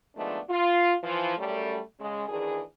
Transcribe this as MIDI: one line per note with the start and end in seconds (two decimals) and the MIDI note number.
0.16 0.37 51
0.16 0.37 53
0.16 0.37 56
0.16 0.37 57
0.16 0.37 59
0.16 0.37 62
0.49 0.93 65
1.03 1.34 52
1.03 1.34 53
1.37 1.78 42
1.37 1.78 55
1.37 1.78 57
1.99 2.24 49
1.99 2.24 56
2.28 2.61 38
2.28 2.61 51
2.28 2.61 52
2.28 2.61 62
2.28 2.61 68